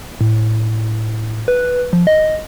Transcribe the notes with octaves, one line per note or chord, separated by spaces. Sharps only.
A2
B4
F3
D#5